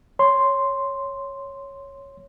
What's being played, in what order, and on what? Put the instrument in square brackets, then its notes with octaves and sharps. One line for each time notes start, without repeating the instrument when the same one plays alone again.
[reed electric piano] C#5 C6